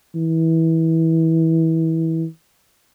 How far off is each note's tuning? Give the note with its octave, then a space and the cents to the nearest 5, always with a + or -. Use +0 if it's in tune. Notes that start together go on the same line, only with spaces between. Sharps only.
E3 -25